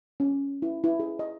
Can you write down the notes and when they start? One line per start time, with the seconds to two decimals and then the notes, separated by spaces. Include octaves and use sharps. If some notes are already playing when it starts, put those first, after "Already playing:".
0.20 C#4
0.62 E4
0.84 E4
1.00 G#4
1.19 D#5